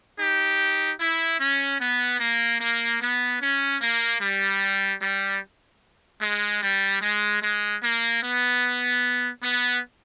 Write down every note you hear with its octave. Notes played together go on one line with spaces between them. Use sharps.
D#4 G4
E4
C#4
B3
A#3
A#3
B3
C#4
A#3
G3
G3
G#3
G3
G#3
G#3
A#3
B3
B3